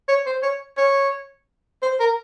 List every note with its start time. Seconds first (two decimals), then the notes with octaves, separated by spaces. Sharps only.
0.08 C#5
0.26 C5
0.43 C#5
0.77 C#5
1.82 C5
2.00 A#4